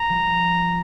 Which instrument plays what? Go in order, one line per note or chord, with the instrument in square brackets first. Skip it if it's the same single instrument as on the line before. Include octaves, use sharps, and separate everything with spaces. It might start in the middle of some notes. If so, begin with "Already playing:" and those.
Already playing: [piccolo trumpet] A#5
[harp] F3 G3